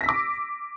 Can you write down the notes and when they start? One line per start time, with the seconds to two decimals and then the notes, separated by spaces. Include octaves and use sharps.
0.01 A#6
0.03 B6
0.06 E6
0.09 D6